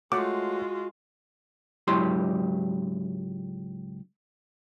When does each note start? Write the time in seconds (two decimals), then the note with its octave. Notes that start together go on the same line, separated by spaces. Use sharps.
0.12 G#3 A3 F4 F#4 C#5 F#5 D6
1.87 C#2 G#2 F#3 E4 G4 C6